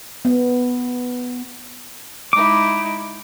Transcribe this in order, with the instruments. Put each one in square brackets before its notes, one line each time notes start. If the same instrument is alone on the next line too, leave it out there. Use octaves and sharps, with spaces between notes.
[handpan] B3
[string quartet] G#3 D#4 E4 [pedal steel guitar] D6